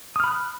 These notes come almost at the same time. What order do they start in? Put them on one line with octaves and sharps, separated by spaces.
D#6 F6 B5 F#6